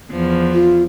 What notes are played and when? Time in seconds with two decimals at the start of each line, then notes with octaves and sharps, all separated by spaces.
0.11 E2 F3
0.54 F4